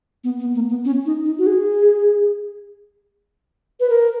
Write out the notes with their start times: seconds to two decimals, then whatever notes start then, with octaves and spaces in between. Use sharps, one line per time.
0.24 B3
0.40 B3
0.55 A#3
0.69 B3
0.85 C#4
1.06 D#4
1.25 D#4
1.38 F#4
1.47 G#4
3.80 B4
3.90 A#4